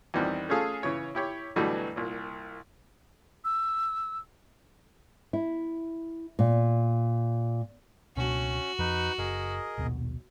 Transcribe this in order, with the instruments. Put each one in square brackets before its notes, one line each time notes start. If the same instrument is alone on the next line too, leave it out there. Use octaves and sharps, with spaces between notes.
[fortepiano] E2 D#3 G3 C4 F#5
A3 C#4 F4 G#4 A4 F5
C#3 E3 C#5
E4 G4 C#5
B2 D3 E3 F#3 G3 A3
C2 A#2
[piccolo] E6
[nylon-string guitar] E4
A#2
[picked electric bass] C#2 B2 D4 [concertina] C#4 [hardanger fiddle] F#4
[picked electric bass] F2 F3 [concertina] D#4 B4
[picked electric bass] F#1 [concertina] G#4 A#4 D#5
[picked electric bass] A#1 D#2 B2